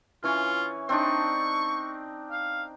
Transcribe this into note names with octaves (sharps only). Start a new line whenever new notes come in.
E3 C#4 F4 C#5
C4 D4 D#4 C#6
F5